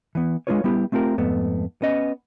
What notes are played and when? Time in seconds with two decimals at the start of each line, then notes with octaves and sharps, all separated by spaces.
0.15 E3 B3
0.47 G#3 A3 D4 F4 B4 C#5
0.64 G3 B3 E4 G4
0.92 A3 C4 F4 G4 A#4
1.18 F2 G#2 A3 B3
1.82 B3 C#4 D#5